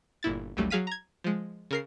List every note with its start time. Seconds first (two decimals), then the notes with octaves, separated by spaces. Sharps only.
0.23 G1 A#2 E4 A6
0.57 A1 D#2 F#3 G3 A3
0.70 F#3 G#4 F5 B6 D#7
0.87 A#5 G#6
1.24 F3 G#3
1.71 C#3 A#4 C7